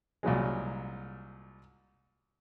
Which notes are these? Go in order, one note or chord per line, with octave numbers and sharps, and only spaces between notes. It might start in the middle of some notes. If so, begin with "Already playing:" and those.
C2 A#2 F#3 G#3